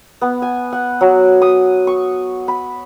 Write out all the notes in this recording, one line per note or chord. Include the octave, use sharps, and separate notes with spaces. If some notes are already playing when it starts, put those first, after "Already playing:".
B3
G#5
F#5
F#3
D#6
C#6
B5